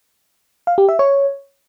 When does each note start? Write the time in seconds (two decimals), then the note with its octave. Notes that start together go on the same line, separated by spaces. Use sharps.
0.67 F5
0.78 G4
0.89 E5
0.99 C#5